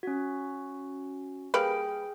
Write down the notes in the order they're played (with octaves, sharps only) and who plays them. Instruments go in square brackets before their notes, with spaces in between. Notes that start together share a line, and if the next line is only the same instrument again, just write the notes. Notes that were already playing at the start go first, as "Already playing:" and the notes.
[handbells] C#4 F#4
[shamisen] G3 A#3 B4 [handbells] G#4 G5 D7